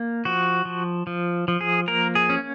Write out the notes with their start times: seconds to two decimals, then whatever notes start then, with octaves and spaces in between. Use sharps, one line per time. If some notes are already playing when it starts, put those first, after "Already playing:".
Already playing: A#3
0.25 F3 F#4
0.65 F3
1.07 F3
1.48 F3
1.61 G#4
1.88 A#3 A#4
2.15 G#4
2.30 C#4